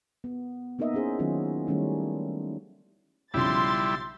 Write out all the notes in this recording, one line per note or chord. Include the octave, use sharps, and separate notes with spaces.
B3
A#3 B3 D#4 A#4 D#5 E5
C#4 E4 G#4 C5
D#3 F#3 C#4 D#4 F4
D#3 G3 A3 C#4 D#4 E4
B1 C#3 F3 G3 E4 C6 A6